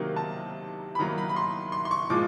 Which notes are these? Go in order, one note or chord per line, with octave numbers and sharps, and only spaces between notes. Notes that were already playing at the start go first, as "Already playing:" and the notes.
Already playing: C3 D#3 F#3 A#3
A5
B5
D#3 F#3 A#3 A#5
B5
B5
C6
C6
C6
C#6
A#2 F3 G#3 D6